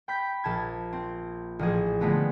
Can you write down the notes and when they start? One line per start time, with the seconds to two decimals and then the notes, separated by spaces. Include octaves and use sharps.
0.08 G5 B5 G6 B6
0.44 A#1 A5 G#6
0.93 C4
1.59 A1 F3 G#4
2.00 D3 F3 G#3 A3 B3 C4